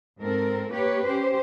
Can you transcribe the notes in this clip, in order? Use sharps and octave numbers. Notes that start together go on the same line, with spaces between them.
G#2 C4 A4 A#4
A#3 G4 B4 C#5
C#4 G4 C5